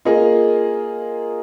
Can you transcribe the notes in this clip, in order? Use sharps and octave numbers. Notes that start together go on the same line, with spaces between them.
A#3 F4 G#4 D#5